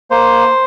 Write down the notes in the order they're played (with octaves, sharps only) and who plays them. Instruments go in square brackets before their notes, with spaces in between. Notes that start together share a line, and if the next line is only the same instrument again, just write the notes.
[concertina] A#3 C5